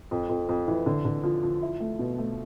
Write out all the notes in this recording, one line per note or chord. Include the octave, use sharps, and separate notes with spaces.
F2
F2
F2
E3
D3
D3
F3
F3
E4
A3
B2
A3